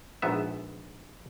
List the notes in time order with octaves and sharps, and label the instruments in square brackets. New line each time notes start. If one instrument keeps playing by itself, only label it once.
[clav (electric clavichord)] A#1 G#2 B3 E5